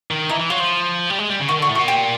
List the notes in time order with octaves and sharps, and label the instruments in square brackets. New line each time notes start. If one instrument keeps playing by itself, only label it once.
[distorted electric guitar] D#3
[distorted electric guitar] E3 [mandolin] D#4
[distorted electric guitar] E3
[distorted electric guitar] F#3 [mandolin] F4
[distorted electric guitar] F3
G3
G#3
G3
C#3
[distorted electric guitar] D#3 [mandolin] F#4
[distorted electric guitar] D3 [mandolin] F#4
[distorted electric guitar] A2
[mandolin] F#4
[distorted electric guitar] A#2
[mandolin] G4